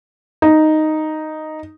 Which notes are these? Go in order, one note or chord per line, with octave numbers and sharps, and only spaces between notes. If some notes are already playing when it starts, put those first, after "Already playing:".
D#4